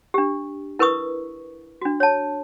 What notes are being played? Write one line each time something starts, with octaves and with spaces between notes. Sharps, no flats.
D4 G4
E4 A#4 B4 C#6 D#6
D4 F#4
C#5 A5